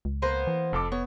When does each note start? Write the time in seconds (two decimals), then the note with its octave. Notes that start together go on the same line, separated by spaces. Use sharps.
0.05 C#2
0.22 A#3 B3 C5
0.47 E3
0.73 F1 F2 A4 D6
0.92 B3 C#5